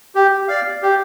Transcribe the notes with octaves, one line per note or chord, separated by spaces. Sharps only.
G4
D5 F5
G4